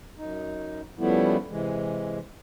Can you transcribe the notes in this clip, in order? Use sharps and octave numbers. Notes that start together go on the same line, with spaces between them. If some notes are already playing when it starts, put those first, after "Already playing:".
F#2 D#4
C#3 F3 G3 A3 B3 E4
C3 E3 G#3